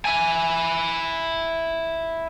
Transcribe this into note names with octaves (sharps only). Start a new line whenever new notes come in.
E4 G#5